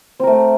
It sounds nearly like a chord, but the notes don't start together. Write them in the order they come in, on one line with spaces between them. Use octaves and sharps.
C4 A#4 A3